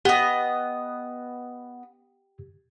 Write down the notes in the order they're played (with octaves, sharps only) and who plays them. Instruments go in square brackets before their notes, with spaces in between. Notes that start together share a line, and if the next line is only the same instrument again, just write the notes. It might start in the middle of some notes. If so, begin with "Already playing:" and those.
[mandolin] B3 D#5 [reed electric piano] G4